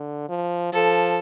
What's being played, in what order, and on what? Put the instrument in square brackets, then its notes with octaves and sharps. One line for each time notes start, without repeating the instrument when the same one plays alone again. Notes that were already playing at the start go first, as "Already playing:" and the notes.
Already playing: [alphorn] D3
F3
[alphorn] F3 [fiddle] A4